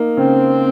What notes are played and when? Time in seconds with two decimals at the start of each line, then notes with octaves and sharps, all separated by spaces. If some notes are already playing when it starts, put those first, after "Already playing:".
Already playing: A#3 D#4
0.17 C#3 C4